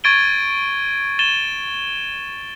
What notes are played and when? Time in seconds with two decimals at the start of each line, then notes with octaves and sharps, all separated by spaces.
0.04 C#6 G#6 A6 D7 D#7 G7
1.19 A6 D#7 E7 G7